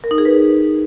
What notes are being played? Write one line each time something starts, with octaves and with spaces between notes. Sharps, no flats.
A#4
D#4
G#4
B4